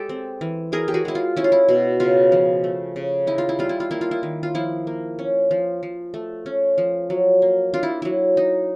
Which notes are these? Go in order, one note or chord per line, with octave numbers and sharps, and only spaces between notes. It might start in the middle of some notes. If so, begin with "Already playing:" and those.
Already playing: G#3 G4 A4
C4
E3
E4 G#4 A#4
G4
F#4 G#4
G#3 E4
F4
C#4 E4
F4
E4
B2
C#3 F4
F3
A3
C#3
D#4 E4
F4
E4
G3 F4
E4
F4
A#3 E4
F4
E4
D#3
F4
F3 E4
A#3
C#4
F3
F3
A3
C#4
F3
F#3
A#3
D4 F4
E4
F#3 E4
D#4